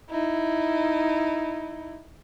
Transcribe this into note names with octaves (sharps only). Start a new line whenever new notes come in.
D#4 E4